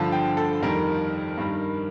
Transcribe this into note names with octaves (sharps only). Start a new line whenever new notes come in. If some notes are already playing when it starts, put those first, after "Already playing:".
Already playing: G2 D3 F3 A5
G5
A4
F2 D#3 G3 A#4
G2 D#3 G3